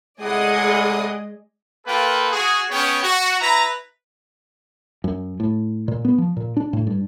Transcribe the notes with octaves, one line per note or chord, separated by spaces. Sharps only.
A2 C3 G#3 G#4 D5 D#5 F#5 D#6
A#3 F4 A4 B4 G5
F#4 G#4
B3 C#4 G#4 C#5 G5
F#4
E4 B4 A#5
F#2
A2
A#2
B3
F3
A#2
D4
A2
G2